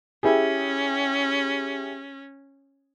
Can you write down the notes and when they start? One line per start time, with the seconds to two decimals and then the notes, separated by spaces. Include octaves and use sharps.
0.23 C#4 E4 G4 G#4